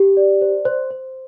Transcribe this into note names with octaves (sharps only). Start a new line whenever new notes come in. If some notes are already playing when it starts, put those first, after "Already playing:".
Already playing: G4
D5
C5
C5
C5